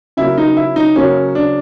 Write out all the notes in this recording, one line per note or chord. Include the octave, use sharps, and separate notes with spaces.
C#3 F#3 A#3 E4
D#4
E4
D#4
C#3 F#3 A#3 C#4
D4